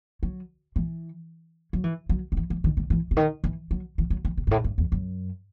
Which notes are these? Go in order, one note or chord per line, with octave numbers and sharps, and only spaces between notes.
F#3
E3
F#3
E3
F#3
D#3
E3
E3
D#3
D#3
E3
C3
D#3
E3
F#3
E3
F#3
E3
C3
G2
A2
G2
E2
F#2